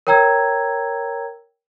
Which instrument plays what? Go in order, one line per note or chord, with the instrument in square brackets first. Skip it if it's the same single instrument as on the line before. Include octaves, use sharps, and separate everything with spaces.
[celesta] A#4 C#5 G5 A#5 E6 G#6